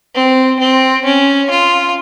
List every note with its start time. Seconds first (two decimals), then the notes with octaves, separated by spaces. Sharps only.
0.15 C4
0.59 C4
1.05 C#4
1.50 F4